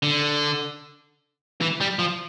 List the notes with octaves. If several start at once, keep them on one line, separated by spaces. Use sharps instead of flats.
D3
E3
G3
F3